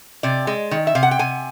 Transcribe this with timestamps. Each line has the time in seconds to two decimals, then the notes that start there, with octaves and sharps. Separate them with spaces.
0.23 C3 D5
0.47 G#3
0.71 D#3
0.87 E5
0.95 C3 F5
1.03 F#5
1.11 G5
1.19 C3 G#5